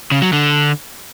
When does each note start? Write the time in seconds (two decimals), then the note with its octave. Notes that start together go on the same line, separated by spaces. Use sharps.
0.12 C#3
0.22 F#3
0.33 D3